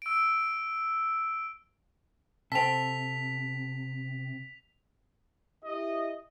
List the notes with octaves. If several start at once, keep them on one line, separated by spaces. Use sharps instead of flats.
E6 D7
C3 C4 A4 B6 F7
E4 G4 D#5